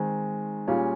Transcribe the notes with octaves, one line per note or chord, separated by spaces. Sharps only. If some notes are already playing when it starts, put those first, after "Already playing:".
Already playing: D#3 G#3 C4
A#2 G3 C#4 F4 G#4